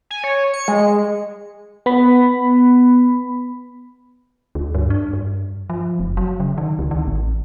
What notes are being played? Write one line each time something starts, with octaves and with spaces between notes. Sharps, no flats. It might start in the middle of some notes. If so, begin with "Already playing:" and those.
G#5
C#5
C#7
G#3
B3 B5
D2
G2
D4
G2
F3
F#1
F#3
C#3
D#3
C#2
D#3
A1